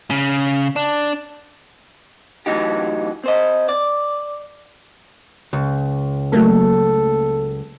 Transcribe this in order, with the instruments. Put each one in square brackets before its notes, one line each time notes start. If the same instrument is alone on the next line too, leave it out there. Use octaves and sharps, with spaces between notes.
[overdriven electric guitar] C#3
D4
[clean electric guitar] A2 E3 F#3 D#4 G4
C4 C5 D#5
D5
[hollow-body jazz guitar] C#2
[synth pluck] F#3 A3 A#3 [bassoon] A4